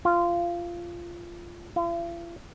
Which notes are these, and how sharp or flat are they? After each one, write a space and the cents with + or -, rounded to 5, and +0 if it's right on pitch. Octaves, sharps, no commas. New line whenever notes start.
F4 -15
F4 -45